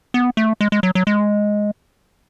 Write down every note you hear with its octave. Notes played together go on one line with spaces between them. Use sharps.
B3
A3
G#3
G#3
F#3
F#3
G#3